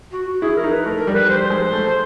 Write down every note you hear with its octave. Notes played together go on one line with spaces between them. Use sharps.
F#4
F#4
E4 G#4
A#4
D#4
B4
A3 A#4
A#4
G3
B4
G3 C5
G#3
A3